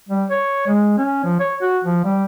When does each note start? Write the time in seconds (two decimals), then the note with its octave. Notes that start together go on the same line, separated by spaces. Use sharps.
0.09 G3
0.30 C#5
0.67 G#3
0.98 C#4
1.24 F3
1.40 C#5
1.62 F#4
1.84 F3
2.05 G3